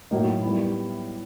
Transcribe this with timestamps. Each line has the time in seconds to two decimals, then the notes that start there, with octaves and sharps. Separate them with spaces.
0.11 A2 F#3 A#3 D#4
0.42 G3 B3 E4